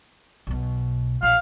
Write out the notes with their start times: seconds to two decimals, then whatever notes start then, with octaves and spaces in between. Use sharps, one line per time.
0.47 B1 B2
1.23 A#1 F5